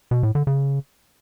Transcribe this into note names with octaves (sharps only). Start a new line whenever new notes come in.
B2
A2
D3
C#3